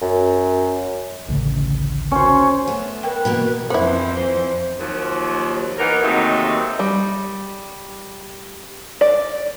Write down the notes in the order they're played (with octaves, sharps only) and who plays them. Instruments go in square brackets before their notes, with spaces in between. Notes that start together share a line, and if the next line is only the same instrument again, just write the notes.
[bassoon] F#2
[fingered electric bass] A1 D2 C#3
[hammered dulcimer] C#4 C5
[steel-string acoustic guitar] A3 B3
[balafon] A#4 G5 [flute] B4
[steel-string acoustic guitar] B2 E3 A#3
[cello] F2 E3 [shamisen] B3 E4 [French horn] C5
[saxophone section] D#2 F3 F#3
E3 A#3 B3 D#4 A#4
D#2 C3 F#3 G#3 A3 D#4
[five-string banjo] G3
D5